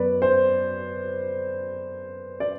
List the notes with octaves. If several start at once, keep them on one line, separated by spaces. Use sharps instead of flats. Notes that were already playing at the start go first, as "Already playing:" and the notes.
Already playing: F#2 F#3 B3 B4 D5
C5
D5